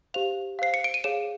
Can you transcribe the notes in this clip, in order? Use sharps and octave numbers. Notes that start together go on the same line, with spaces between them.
G4 C5 F5 F7
C5 F5 C7
C#7
D7
D#7
G#4 C#5 F5 E7